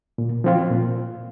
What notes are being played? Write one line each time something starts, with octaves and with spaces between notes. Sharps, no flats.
A#2
F3 C4 F4
A#2